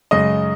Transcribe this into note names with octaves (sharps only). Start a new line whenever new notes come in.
F#2 C#3 G#3 D#5